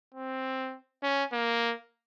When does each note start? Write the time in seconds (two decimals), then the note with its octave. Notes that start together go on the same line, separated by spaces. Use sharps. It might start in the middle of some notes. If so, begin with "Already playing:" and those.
0.14 C4
1.03 C#4
1.33 A#3